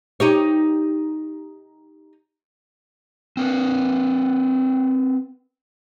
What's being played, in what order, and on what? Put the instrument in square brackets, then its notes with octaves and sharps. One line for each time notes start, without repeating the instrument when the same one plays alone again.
[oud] D#4 G4 C#5
[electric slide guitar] C4 A#4 B4